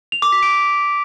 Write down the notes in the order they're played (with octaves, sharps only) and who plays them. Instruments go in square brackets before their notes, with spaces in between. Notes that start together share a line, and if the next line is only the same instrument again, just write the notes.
[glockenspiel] F7
D6
B6
D7